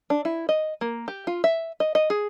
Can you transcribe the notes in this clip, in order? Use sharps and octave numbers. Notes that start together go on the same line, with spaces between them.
D4
E4
D#5
A#3
G4
F4
E5
D#5
D#5
G#4